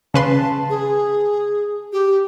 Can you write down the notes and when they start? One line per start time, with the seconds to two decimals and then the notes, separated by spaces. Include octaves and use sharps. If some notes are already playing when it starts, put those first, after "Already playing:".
0.14 C#3 B4 A5 C6
0.69 G#4
1.93 G4